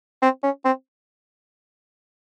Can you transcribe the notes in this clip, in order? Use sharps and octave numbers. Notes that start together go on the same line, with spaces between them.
C4
C#4
C4